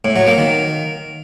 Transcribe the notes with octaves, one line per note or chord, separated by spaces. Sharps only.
A2
F#3
A#3
D#3